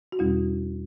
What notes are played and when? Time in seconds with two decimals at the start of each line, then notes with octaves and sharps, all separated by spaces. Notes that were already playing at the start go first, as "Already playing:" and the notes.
0.12 F#4
0.19 E2 B2 G3 C#4 E4